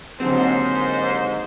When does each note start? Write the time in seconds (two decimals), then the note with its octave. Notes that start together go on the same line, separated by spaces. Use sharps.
0.20 D#2 G#2 D3 F#3 C4 C5